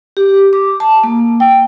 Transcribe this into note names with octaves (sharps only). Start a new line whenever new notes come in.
G4
D6
A5
A#3
G5